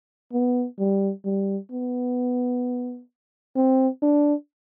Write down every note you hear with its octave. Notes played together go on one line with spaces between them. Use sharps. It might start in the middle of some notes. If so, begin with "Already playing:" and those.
B3
G3
G3
B3
C4
D4